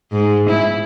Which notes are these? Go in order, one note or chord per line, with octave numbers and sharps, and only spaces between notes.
G#2
E4